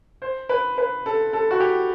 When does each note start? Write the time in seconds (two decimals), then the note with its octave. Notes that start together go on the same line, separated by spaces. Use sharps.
0.22 C5
0.49 B4
0.78 B4
1.06 A4
1.33 A4
1.51 F#4
1.60 G4